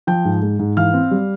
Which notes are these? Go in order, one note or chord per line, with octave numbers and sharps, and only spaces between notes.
F3 G5 G6
G#2
G#3
G#2
E3 F5 F6
C4
G3